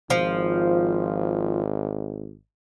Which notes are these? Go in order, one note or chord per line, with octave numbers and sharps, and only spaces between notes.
G#1 F3